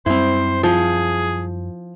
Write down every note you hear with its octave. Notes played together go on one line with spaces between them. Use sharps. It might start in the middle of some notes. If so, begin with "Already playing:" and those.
F#2 G3 C4 E4 C5
F3 G#4